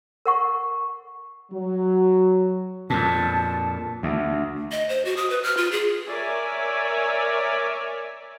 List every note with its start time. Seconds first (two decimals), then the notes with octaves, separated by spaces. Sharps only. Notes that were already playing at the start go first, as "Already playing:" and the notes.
0.26 A#4 F#5 C#6
1.52 F#3
2.90 F2 A#2 A5
4.03 D2
4.72 D#5
4.89 C5
5.05 F#4
5.16 D#6
5.30 B4
5.43 F6
5.57 F4
5.72 G#4
6.08 A#4 C#5 D5 E5 G#5